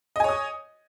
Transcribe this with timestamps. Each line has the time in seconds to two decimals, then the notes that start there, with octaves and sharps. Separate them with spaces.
0.16 D#5
0.20 G#5
0.24 C#5
0.28 D#6